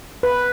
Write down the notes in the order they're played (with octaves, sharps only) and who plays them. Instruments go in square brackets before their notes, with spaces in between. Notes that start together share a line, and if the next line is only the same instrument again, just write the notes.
[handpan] B4